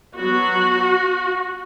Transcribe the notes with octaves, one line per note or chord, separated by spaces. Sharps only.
F#3 B3 F#4